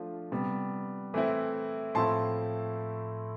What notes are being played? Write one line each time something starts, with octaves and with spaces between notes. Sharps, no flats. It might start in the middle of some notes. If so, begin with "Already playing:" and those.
Already playing: F3 A3 D4 F4
C3 G3 B3
E3 A3 C4 E4
A2 F3 A3 C4 E4 A5 C6